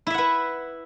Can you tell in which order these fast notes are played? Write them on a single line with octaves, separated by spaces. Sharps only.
E4 E5 F#5 B4